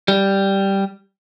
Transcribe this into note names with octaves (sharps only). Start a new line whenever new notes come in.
G3